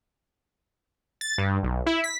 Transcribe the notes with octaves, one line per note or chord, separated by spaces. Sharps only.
A6
G2
B1
E4
B6